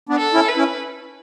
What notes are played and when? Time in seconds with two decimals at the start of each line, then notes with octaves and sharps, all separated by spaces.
0.09 B3 D4
0.18 A4
0.33 C#4 E4
0.49 B4
0.57 C#4 E4